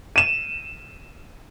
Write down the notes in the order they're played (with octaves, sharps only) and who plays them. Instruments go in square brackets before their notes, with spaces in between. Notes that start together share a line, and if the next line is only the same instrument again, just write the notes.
[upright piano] D#7 E7